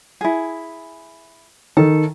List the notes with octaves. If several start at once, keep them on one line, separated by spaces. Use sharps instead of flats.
E4 G#4
D#3 A4